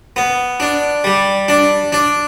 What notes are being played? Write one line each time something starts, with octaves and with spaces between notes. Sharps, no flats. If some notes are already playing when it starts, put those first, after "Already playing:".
B3
D4
G3
D4
D4